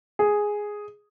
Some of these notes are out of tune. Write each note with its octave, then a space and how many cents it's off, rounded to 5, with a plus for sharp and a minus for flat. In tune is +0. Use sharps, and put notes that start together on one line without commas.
G#4 +0